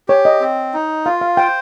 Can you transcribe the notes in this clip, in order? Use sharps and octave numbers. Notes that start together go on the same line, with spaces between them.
G4 C#5
D#5
C4
D#4
F4 F5
F5
C5 G5